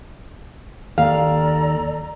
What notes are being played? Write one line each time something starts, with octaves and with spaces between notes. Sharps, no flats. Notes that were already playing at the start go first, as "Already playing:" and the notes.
D#2 A4 D5 F5 A#5